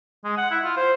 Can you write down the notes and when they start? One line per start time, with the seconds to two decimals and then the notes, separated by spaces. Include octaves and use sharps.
0.24 G#3
0.37 F#5
0.51 E4
0.64 F4
0.77 C5